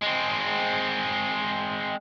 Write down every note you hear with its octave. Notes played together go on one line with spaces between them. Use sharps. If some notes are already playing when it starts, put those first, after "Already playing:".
G#3 C4